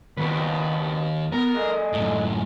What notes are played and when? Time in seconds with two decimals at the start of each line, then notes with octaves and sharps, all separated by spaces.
0.17 D#2 C4 F#4 B4
1.32 B3 A#4
1.55 G#4 A4 D#5
1.93 F#2 A2